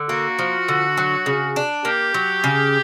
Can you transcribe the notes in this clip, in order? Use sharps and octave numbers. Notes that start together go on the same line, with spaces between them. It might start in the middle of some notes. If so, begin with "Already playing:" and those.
Already playing: D3
A#3 F#4
F3
D3
F#3
C#3
D4
A#3 G4
F#3
C#3